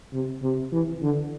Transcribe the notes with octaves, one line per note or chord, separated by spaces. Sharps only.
C3
C3
E3
D3